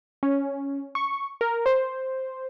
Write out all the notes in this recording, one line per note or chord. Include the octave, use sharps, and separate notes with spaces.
C#4
C#6
A#4
C5